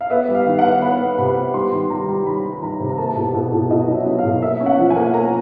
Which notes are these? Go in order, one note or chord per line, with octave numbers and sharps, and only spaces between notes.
F5
B3 E5
G3
F5
D#3
F#5
B3
B3 B5
B3
C3 B5
B3
G3 C6
D#3
G3 A#5
G3
D#3 B5
G3
B5
D#3 A#5
C3
A#5
A#3 A5
B2
B2
B2
B2 D#5
F#3
E5
F#3
F5
B2
A#3 E5
C#4
F#5
F3
G#5
A#3
A#3 A#5